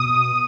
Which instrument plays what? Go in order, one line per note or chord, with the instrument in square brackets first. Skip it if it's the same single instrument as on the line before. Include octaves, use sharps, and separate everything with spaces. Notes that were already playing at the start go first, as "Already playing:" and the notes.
Already playing: [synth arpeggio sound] B2 D#6